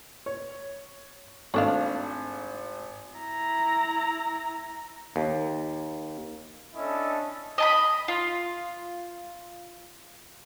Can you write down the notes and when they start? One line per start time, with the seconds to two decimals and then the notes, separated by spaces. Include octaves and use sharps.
0.26 C#5
1.54 G#1 A3 D4 F5
3.16 E4 A#5
5.16 D#2
6.75 C#4 D4 E4 A4 C#5 D#5
7.58 D#5 A5 B5
8.08 F4